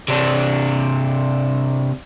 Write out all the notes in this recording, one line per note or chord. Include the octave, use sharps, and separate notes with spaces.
C3 D4